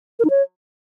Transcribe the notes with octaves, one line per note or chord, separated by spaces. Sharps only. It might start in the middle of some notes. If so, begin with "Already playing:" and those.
A#4
D#4
C#5